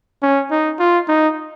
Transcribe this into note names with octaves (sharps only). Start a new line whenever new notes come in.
C#4
D#4
F4
D#4